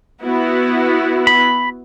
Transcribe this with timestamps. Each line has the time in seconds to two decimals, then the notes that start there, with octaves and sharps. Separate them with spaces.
0.22 B3 E4 F#4
1.27 B5